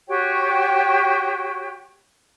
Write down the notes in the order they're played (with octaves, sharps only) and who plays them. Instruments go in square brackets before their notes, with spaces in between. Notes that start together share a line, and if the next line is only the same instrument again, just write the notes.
[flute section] F#4 G4 C#5 G5